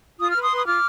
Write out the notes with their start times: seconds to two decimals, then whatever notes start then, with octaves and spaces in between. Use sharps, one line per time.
0.19 F4 D#6
0.31 F6
0.36 B4
0.41 C6 D#6
0.50 B4
0.57 D#6
0.66 F4 D6 F6